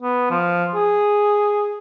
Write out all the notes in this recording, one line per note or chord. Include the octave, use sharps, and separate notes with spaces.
B3
F3
G#4